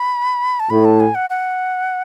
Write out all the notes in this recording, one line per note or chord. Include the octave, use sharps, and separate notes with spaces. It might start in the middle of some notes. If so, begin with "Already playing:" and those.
Already playing: B5
A5
A2 B5
A5
G#5
F#5
F#5